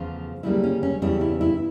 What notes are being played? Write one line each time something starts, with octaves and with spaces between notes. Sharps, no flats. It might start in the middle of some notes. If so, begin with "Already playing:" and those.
Already playing: E2 C#3 F3 A3 F4
D2 C#3 G3 A#3 E4
C#4
C#4
E2 C#3 G3 E4
E4
E4